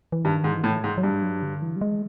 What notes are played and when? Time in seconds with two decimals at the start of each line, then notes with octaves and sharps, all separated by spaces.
0.12 E3
0.24 G2 D#3
0.44 G#2
0.51 E3
0.64 A2
0.84 G#2
0.98 F#3
1.03 G2 G3
1.23 F#3
1.42 D3
1.62 E3
1.76 G3
1.81 G#3